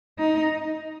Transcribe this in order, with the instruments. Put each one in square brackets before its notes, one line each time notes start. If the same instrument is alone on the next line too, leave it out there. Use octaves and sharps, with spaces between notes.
[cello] D#4